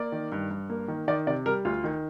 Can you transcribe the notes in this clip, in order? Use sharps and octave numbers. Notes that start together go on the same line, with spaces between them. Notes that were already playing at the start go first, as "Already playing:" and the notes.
Already playing: A#3 D5
D#3
G2
G2
A#3
D#3
D#3 D5
C3 D5
G3 A#4
D2 F4
D#3